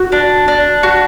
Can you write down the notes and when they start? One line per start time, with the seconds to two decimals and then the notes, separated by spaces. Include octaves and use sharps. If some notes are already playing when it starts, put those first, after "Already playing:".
Already playing: F#4
0.12 D4
0.48 D4
0.83 F#4